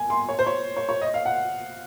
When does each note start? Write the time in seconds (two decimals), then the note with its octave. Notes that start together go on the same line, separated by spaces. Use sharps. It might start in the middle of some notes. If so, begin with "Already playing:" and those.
Already playing: G#5
0.10 C6
0.29 C#5
0.39 C5
0.47 C#5
0.77 C#5
0.89 C#5
1.01 D#5
1.14 F5
1.25 F#5